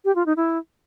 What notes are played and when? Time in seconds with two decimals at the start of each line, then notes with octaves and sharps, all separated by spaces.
0.05 G4
0.15 F4
0.26 D#4
0.37 E4